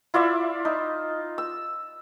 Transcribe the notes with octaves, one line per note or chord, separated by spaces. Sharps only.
E4 F4 D5 E5
D#4
E6